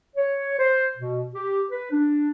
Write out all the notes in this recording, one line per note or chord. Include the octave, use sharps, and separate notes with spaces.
C#5
C5
B2
G4
B4
D4